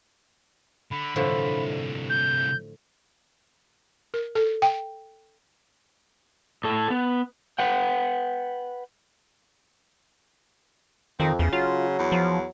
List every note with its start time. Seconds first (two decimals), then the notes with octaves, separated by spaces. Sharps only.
0.91 D3 B5
1.16 C2 A2 D3 E3 F3
2.10 G6
4.14 A#4
4.35 A4
4.62 G5
6.64 A2 A4
6.90 B3
7.59 B4 F#5 G5
11.20 F2 D#3 C4
11.39 E2 C#3
11.53 F#3 F4
11.99 E2
12.12 F3